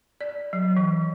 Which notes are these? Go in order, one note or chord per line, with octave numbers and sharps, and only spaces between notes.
D5
F#3
E3